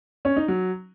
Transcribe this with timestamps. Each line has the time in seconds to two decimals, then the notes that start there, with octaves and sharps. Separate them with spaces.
0.25 C#4
0.37 D#4
0.48 F#3